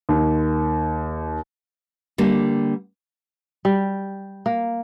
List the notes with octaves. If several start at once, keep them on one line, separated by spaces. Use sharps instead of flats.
D#2
D3 G3 A#3
G3
A#3